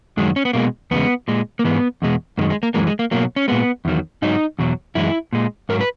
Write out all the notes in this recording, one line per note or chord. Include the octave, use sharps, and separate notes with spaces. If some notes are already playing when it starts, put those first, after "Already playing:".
F#2 D#3 F#3 G#3
C#4
B3
B2 G#3 A#3
E2 C#3 G#3 B3
A#2 G#3
A#3
G#2 E3 G#3 B3
E2 B2 G#3
F#2 D#3 G#3 A#3
G#3
A#3
F#2 E3 G#3 A#3
G#3
A#3
B2 F#3 A#3
C#4
A#2 G#3 B3
E2 D#3 F#3
G#2 F#3 D#4
E2 B2 F#3
F#2 E3 G#3 E4
A#2 G#3
G#2 F#3 A#4
B4